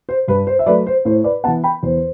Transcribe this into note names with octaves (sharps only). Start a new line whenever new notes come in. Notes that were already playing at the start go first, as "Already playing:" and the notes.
C5
G2 B4
C5
E5
F#3 A3 B4 D5
C5
A2 C5
B4 D5
E3 B3 F#5 A5
G5 B5
E2 C5